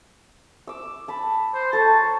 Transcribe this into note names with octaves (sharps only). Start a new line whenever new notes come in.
D6 E6
A5 B5
C5
A4 C#5 A5 A#5